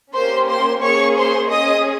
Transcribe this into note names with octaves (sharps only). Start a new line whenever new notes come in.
A#3 C#4 G4 C5 C6
C5 C6
A#3 C#4 G#4 C#5 C#6
C5 C6
C#4 G#4 D#5 D#6